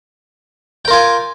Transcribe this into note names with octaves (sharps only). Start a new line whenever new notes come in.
F4 A#4 G5 G#5